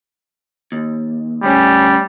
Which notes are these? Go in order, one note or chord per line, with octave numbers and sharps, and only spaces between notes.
D#2
D2 G3 C#4